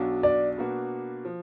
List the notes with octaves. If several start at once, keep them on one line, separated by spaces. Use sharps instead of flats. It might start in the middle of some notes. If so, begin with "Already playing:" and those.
Already playing: B1 B2 F#3 D4 F#4
D5
B2 A#3 D4 F#4 B4
F3